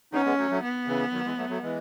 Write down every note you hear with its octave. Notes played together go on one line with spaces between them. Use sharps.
B3 C#4 D#4
G#3 B3
F#3 A3
F#3 A3
B3
C#3 E3
D#3 F#3
E3 G#3
F#3 A3
F#3 A3
E3 G#3